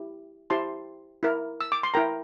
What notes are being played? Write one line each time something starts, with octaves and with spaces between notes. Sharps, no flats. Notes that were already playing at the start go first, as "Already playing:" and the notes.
Already playing: E4 G4
E4 G4 C5 A5 C6
E4 A#4
E6
D6
C6
E4 A#4 G5 A#5